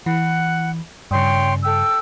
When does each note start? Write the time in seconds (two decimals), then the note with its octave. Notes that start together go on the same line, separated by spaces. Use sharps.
0.06 E3 F#5
1.11 G2 C#3 C#5 G5 C6
1.63 A4 G5 E6